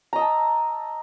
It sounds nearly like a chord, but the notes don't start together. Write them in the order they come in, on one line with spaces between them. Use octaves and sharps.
A#5 D#5 E6 A5